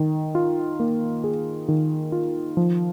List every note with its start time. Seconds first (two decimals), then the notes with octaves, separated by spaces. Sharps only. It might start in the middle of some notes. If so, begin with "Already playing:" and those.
Already playing: D#3
0.35 F4
0.80 A#3
1.24 G#4
1.68 D#3
2.12 F4
2.57 F3